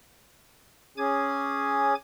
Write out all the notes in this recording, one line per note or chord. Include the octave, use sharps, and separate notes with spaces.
C#4 G#4 G#5 D6 G#6